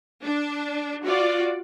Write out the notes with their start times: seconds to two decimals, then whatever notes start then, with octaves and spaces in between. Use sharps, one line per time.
0.24 D4
1.04 F4 F#4 D5